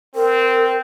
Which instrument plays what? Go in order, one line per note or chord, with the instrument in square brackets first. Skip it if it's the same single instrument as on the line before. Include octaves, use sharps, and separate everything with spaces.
[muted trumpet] C4 [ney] A#4